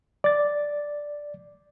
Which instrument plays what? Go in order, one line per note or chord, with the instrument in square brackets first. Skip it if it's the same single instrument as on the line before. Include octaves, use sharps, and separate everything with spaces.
[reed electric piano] D5 A6